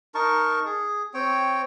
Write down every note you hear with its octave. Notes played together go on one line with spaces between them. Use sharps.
D#4 A#4 A5 C#6
G#4
C4 C#5 G5